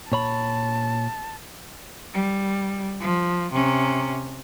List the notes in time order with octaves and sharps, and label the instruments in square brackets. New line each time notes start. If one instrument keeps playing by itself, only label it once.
[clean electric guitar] A#2 C#5 B5 [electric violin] A5
[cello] G3
F3
C3 C#4